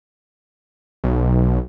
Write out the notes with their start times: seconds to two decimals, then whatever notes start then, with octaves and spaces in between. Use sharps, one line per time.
1.04 B1